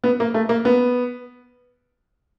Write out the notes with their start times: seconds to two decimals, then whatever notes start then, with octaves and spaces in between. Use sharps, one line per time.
0.04 B3
0.20 A#3
0.34 A3
0.49 A#3
0.65 B3